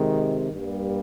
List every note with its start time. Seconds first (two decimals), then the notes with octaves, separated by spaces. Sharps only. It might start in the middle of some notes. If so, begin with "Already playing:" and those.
Already playing: C3 D#3 G#3
0.51 G2 G3 A#3